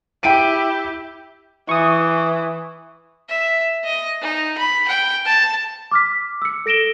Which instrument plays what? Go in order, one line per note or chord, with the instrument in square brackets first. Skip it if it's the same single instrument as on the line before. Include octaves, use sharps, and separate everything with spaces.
[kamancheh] E4 G4 [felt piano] G5 D7 D#7
[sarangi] E3 [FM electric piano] C#6 D#6
[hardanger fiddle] E5
D#5
D#4
B5
G5
A5
[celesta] D6 F6 B6
E6 C#7
A4 A#6 D7 E7 G7